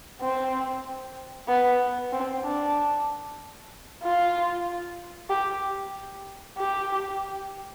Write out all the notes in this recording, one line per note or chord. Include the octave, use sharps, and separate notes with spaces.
C4
B3
C4
D4
F4
G4
G4